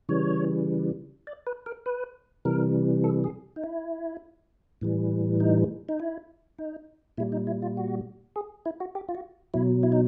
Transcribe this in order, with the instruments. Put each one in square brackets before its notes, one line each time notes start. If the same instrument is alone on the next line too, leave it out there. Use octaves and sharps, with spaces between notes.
[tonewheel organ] C#3 E3 G3 C#5
D5
B4
A#4
B4
C3 E3 G3 A#4
A4
G#4
D#4
E4
A2 E3 G3
D#4
D#4
E4
D#4
A#2 G3 E4
D#4
E4
F4
F#4
G#4
E4
F#4
G4
F4
F#4
B2 F#3 E4
E4
D#4